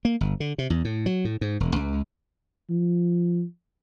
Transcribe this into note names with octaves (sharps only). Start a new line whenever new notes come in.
A#3
G1
D3
C3
E2
A2
F#3
A2
G#2
E1
C#2
F3